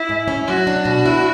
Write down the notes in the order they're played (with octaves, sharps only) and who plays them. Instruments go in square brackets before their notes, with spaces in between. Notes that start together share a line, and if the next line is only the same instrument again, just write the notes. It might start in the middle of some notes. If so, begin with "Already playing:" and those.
Already playing: [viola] E4
[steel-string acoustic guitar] G#2
C#4
[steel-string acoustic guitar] F#3 [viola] F#4
[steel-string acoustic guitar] D4
B2
E4